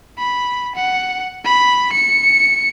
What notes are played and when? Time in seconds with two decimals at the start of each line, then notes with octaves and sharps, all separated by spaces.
0.18 B5
0.75 F#5
1.45 B5
1.92 C#7